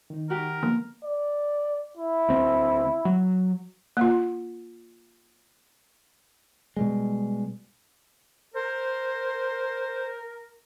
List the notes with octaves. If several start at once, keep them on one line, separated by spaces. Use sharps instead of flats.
D#3 D#4
F#4 G4 A#4
D3 F3 A#3 B3
D5
E4
D2 C4
F#3
A#3 F4
B2 G3 G#3
A#4 C5